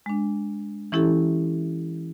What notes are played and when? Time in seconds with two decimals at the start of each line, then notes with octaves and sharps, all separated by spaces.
0.06 G#3 D4
0.92 E3 C#4 E4 G4 A4